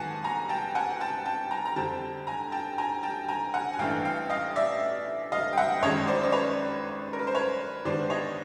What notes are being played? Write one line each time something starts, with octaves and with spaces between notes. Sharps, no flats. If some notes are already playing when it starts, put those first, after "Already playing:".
Already playing: G#2 D#3 F#3 B3 F#5 G#5 A5
G#5 A#5
G5 A5
F#5 G#5
G5 A5
G5 A5
G#5 A#5
A#5
F2 D3 G3 C4 G5 A5
G#5 A#5
G5 A5
G#5 A#5
G5 A5
G#5 A#5
F#5 G#5
G#5
A1 G2 E3 A3 D4 F5 G5
F5 G5
D#5 F5
D5 E5
D#5 F5
G5
E5 F#5
G#1 F#2 D#3 G#3 C#5 D#5
C5 D5
D5
B4 C#5
A#4
B4
C5
B4 C#5
G#2 D#3 G3 B3 D4 C5 D5
C#5 D#5